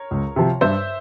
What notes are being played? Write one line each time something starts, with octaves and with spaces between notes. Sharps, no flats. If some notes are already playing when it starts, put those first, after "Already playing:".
Already playing: A#4 C#5
C#2
C3 F3
G2 C5 E5